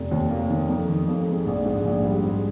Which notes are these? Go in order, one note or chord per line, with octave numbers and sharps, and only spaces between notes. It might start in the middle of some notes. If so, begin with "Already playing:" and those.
Already playing: F1
D#2
A#3
D#3
F2
D#3
F2
G#3
A#1
G#2
A#1
G3
G#2